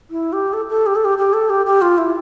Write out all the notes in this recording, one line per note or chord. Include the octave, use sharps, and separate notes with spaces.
E4
G4
A4
A4
G4
A4
G4
G4
A4
G4
G4
F4
E4